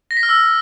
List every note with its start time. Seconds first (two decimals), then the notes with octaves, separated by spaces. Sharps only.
0.11 A#6
0.17 B6
0.23 F6
0.29 E6